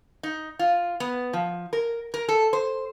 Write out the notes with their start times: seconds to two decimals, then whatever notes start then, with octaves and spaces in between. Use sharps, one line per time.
0.23 D#4
0.59 F4
1.00 B3
1.33 F3
1.73 A#4
2.14 A#4
2.29 A4
2.53 C5